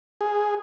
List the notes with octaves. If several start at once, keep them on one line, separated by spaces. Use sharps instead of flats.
G#4